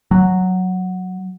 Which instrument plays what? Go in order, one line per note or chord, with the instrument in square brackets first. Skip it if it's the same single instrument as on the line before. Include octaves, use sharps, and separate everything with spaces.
[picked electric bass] F#3